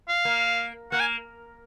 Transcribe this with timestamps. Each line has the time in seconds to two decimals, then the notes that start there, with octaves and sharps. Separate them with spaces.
0.08 F5
0.25 A#3
0.92 A#3 F#5
1.00 G#5